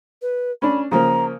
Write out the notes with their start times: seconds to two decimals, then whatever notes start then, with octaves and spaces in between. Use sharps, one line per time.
0.22 B4
0.62 C#4 D4 B5
0.92 C#3 F3 A#3 A#5